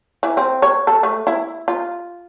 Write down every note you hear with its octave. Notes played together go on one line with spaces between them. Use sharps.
E3
C4
C#5
A4
A3
E4
F4